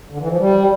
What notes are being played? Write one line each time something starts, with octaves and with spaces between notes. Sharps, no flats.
D3
E3
F3
G3